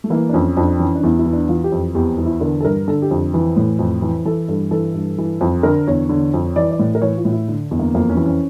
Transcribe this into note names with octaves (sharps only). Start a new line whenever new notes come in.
A3
E3 A#3
D4
F2 C#4
F2 D4
E3 C#4
D4
E2 E4
E4
E3
D4
E3 F4
G4
F2
E2 G4
E3
E4
D3 A#4
A4
G2 A#4
D3 A4
G4
F2
E3
A2
F2
E3
E3 A4
G2 A4
E3 A4
G2
E3
F2
D3 A#4
E2 C#5
D3
F2
E3 D5
D5
A2
A#4
E3 C#5
F4
A2
E4
D3 D4
E2
A#3
F2 A#3
C#4
E3
C#4